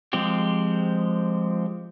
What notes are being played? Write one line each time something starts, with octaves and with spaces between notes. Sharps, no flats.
F3 G#3 C4 G4